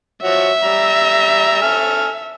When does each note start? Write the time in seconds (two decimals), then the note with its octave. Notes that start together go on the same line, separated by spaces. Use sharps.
0.23 F3 F#4 C#5 E5
0.63 G3 A#5
1.62 A4 G#5 F6